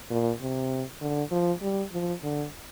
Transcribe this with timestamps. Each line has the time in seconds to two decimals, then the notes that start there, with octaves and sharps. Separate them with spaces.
0.11 A#2
0.41 C3
1.02 D3
1.31 F3
1.62 G3
1.92 F3
2.23 D3